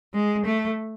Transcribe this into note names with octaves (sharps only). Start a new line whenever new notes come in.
G#3
A3